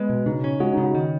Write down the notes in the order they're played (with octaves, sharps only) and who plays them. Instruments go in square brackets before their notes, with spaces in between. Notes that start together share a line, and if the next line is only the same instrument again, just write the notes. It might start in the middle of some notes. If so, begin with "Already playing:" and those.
Already playing: [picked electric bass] G#3 [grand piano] B3
[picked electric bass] B2
[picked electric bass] C#3 [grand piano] D#4
[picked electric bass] C#4
[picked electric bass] G#3 [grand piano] F#4
[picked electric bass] C#3 [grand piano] D#4
[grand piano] F#4
[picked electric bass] D#3